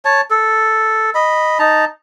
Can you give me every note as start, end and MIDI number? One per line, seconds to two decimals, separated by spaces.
0.05 0.21 73
0.05 0.21 81
0.31 1.10 69
1.15 1.58 75
1.15 1.58 83
1.59 1.85 63
1.59 1.85 81
1.59 1.85 82